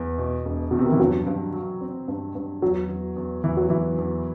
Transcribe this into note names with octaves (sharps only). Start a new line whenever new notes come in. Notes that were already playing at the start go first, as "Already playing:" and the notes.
Already playing: E2 E3
B2
E1
E2 B2
C3
D#3
E3
G2 F#3
G2
F#3
C4
G2
G2
E2 F#3
E2
E2
E2 E3
F#3
E2 E3
E2